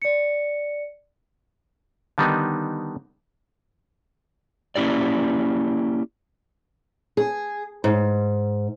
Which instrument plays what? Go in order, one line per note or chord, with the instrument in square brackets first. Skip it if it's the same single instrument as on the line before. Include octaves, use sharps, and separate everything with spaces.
[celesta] D5 C#7
[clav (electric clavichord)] D3 D#3 G3 B3 D#4
[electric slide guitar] A#3 C#4 E4 G4 D5
[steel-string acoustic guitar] G#4
G#2